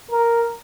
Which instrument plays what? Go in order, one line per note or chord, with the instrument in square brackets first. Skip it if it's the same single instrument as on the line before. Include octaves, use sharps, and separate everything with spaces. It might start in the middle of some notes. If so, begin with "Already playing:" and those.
[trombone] A#4